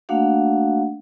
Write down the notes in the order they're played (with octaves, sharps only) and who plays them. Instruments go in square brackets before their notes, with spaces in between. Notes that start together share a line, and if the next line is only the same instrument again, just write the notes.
[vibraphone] A3 A#3 D4 F#4 F5 F#5